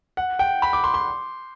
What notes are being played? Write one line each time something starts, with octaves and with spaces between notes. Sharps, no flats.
F#5
G5
B5
D6
C6
C6